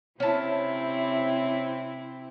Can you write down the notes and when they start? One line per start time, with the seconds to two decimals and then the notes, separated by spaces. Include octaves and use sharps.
0.20 C3 C4 C#4 E4 A5